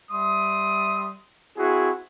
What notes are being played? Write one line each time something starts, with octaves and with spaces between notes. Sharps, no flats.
G3 E5 C6 D#6
C4 E4 F#4 G#4